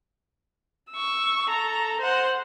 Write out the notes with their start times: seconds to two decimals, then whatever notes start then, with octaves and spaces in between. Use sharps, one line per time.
0.91 C#6 E6
1.49 A4 A#5
2.01 C5 F#5